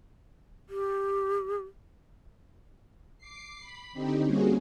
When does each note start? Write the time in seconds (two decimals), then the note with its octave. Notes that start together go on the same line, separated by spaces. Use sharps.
0.69 G4
3.18 D6 C7
3.60 B5
3.93 D3 C4 D#4 G4
4.23 G3 A#3 C4 C#4 F#4 G#4